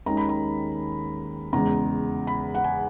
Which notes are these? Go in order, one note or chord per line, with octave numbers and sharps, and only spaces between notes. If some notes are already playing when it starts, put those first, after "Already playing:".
D#2 D#3 G#3 C#4 A#5
B5
A#5
E2 C#3 G#3 A#5
B5
F#5
G#5